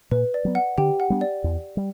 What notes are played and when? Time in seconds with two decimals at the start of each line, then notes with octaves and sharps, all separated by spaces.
0.11 A#2 B4
0.34 D5
0.45 F#3 B3
0.55 F#5
0.78 D3 G4 G5
1.00 F#5
1.10 G3 B3 D4
1.21 D5
1.44 E2
1.77 G3